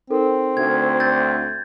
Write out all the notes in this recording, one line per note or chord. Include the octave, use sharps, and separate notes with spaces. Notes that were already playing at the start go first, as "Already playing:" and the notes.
C4 D#4 A4 A#4
D2 G#6
G6 A6